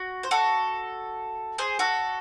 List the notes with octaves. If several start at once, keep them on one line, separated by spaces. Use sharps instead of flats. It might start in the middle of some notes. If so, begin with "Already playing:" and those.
Already playing: F#4
C5
F#4 A4
G#4 C5
F#4 A4